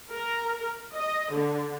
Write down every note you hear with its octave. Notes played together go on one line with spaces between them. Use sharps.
A#4
D#5
D3